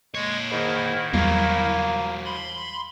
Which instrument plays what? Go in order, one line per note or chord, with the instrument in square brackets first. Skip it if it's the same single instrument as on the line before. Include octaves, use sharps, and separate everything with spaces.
[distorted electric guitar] A#2 C#5 [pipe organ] G#3 G#6
[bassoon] G#2 [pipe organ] D#3 E4
[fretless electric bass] E2 G3 [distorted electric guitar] F#3 F4 [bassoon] A#3
[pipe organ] B5 C6